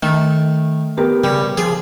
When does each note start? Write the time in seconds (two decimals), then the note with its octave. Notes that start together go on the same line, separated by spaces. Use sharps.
0.03 D#3 A3
0.97 B3 G4 A#4
1.24 C#3 G3
1.58 F3 G#4